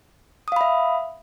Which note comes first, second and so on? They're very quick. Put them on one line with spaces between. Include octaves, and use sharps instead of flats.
D#6 F5 B5 E5